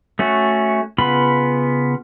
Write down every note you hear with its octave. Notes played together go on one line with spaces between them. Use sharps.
A3 C#4 F#4
C#3 B3 F4 B5